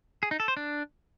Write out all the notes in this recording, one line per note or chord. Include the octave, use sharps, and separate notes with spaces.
G#4
D#4
A4
C5
D4